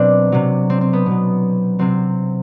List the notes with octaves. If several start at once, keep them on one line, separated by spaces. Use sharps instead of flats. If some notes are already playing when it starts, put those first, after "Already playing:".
Already playing: B2 F#3 C4 D4
C3 F#3
C4
C4
B3
B2 F#3
C3 F#3 C4